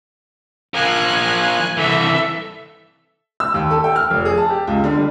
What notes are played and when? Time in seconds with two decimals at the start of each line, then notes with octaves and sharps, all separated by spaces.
0.74 F3 A#3 G#5 F#6
1.77 C2 E3 A4 E5
3.40 E6
3.54 D#2
3.71 A4
3.84 G5
3.96 F6
4.11 F1
4.25 G#4
4.38 A5
4.50 G4
4.67 C#2
4.84 D3
4.97 G3